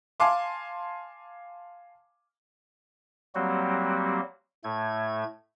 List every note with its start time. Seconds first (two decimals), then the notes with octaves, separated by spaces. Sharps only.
0.20 F5 G#5 A5 C6 D6
3.35 F#3 G3 A#3 C4 F#4 G4
4.64 A2 A3 G#6